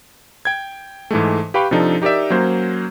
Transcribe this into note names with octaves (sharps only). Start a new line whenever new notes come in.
G5 G#6
G#2 E3 G#3 A3
G4 B4 F5 G5 B5 C#6
C3 F3 D4 D#4 A4
D#4 G4 A#4 D5 E5
F#3 A#3 C#4 C5